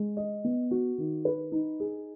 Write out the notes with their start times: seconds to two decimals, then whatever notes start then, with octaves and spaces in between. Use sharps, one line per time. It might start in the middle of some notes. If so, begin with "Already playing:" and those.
Already playing: G#3
0.17 D#5
0.44 B3
0.71 F#4
0.98 D#3
1.25 B4
1.52 D#4
1.80 G#4